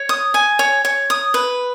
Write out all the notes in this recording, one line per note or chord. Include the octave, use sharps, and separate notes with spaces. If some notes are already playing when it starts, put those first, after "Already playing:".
Already playing: C#5
D#6
G#5
C#5
C#5
D#6
B4